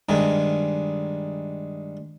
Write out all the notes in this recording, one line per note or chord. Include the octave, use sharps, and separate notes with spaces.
G2 D#3 G#3